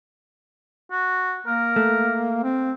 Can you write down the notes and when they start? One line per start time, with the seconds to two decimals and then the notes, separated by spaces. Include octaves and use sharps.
0.91 F#4
1.47 A#3 A#4
1.76 A3
2.44 C4